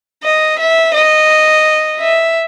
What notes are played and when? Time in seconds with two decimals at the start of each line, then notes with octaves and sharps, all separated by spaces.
0.24 D#5
0.59 E5
0.95 D#5
1.99 E5